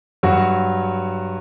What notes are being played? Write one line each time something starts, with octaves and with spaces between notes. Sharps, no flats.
G2 F#3 F#4